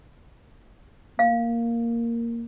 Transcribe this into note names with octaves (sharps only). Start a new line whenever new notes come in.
A#3 F5